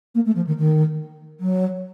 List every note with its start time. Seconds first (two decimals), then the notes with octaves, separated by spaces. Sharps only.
0.15 A#3
0.26 A3
0.35 F3
0.47 D#3
0.57 D#3
1.40 F#3